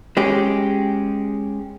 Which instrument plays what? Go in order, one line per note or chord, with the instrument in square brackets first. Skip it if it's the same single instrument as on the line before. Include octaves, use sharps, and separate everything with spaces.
[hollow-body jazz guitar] G#3 C#4 G4